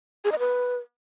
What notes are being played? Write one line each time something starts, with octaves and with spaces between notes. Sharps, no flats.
G#4
D#5
B4